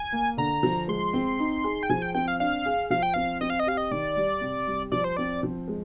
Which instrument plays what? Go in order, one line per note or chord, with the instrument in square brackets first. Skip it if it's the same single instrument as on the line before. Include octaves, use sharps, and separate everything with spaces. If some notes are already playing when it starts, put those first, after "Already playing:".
Already playing: [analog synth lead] G#5
[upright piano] A#3
[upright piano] D3 [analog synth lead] A#5
[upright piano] F3
[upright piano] G#3 [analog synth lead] C6
[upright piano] C4
D#4
G#4
[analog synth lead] G5
[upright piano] F3 [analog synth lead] G#5
[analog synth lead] G5
[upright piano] C4 [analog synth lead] G5
[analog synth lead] F5
[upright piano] D4 [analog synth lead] F5
[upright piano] G#4
[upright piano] F3 [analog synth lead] F5
[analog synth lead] G5
[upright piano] C4 [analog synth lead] F5
[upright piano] C4 [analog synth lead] D#5
[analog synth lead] F5
D#5
[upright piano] G4 [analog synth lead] F5
[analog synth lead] D#5
[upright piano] D#3 [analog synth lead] D5
[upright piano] G3
C3
G3
[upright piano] F3 [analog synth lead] D5
[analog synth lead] C5
[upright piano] C4 [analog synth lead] D5
[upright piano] F3
G#3